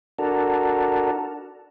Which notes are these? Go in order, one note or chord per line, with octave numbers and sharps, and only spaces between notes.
D4 F#4 A4 A#4